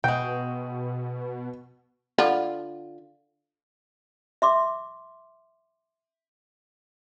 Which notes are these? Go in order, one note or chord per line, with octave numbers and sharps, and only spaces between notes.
B2 G#3 F#4 G5
D3 F4 B5
E5 C6 D6